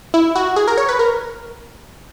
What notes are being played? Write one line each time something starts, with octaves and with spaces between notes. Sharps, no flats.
E4
F#4
G#4
A#4
C#5
B4
A#4